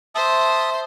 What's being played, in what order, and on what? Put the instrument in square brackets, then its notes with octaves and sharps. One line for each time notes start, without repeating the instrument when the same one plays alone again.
[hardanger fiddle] C5 C6 [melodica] E5 A5 D#6